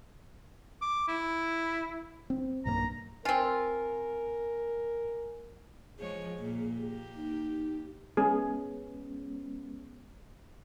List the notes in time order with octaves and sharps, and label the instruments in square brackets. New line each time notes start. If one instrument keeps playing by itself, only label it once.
[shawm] D6
E4
[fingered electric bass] C4
[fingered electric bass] B1 G2 A#3 [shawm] A#5
[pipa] C4 F4 [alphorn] A#4 [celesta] G#5
[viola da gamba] F3 G#3 C#5 [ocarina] G#4
[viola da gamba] A#2 A#3
A#3 G4
[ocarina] D#4
[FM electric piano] G#3 B3 C#4 [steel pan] G#4